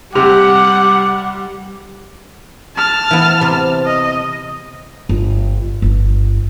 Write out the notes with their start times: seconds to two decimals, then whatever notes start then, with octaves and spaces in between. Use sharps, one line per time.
0.15 C3 G3 F#5 D6
2.76 A5 F6
3.11 E3 B3
3.41 C3
3.86 D#5
5.09 G1
5.82 G1